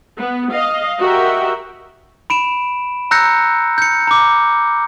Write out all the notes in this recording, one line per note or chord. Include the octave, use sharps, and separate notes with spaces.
B3
D#5 F5
F#4 G4 A#4 D#5 E5 G5
B5 D7 E7
A#5 E6 F#6 G6 A#6 C#7
G6 C#7
A#5 D6